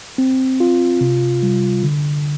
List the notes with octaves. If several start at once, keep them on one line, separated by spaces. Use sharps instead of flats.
C4
F4
C3
G3
D3